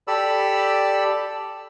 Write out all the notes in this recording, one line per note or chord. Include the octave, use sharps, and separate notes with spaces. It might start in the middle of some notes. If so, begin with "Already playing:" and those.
G4 A4 D5 B5 E6